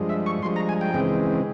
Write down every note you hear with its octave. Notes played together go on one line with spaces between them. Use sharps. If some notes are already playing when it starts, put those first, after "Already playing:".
Already playing: G2 F3 G#3
E5
C#6
G2 F3 G#3 C6
A#5
G#5
G5
C#3 E3 G#3 C4